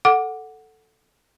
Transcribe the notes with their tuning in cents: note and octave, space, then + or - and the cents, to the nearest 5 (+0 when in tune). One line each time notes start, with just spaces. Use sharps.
A4 +0 F#5 +0 D6 +0